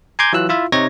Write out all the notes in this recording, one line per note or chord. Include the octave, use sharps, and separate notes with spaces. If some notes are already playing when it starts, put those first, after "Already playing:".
G#5 A#5 C6 D6 G6 G#6
E3 F#3 F4 E6 F#6
E4 F4 E5
C3 D#4 C#5 G#6 A#6